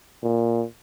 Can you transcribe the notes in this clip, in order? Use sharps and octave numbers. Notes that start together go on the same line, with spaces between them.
A#2